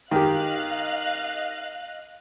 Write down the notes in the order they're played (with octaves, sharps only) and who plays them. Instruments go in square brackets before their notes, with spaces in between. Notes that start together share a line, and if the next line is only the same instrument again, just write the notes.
[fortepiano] D#3 G4 [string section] D#5 F5 F#6